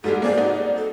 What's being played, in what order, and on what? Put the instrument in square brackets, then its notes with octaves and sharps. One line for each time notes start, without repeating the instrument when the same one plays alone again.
[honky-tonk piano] G#2 G3 G#3 [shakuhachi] A4
[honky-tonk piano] A#3 C4 G#4 [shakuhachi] D5
[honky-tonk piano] D#4 F#4
[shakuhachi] A4